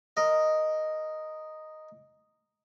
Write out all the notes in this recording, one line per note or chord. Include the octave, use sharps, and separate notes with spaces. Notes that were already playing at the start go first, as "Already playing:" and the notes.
A#4 D#5